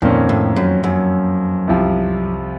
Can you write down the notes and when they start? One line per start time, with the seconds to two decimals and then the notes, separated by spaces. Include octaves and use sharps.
0.02 F2 A#2 D#3 A#3 C#4
0.29 A2
0.56 F#2
0.84 F#2
1.67 C2 C3 F3